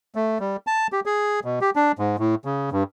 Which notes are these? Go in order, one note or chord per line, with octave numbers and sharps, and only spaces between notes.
A3
G3
A5
G4
G#4
B2
G4
D4
G#2
A2
C#3
G2